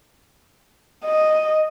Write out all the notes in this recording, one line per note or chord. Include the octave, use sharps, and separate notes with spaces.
D#5